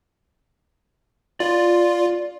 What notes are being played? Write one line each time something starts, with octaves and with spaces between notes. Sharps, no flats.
F4 D5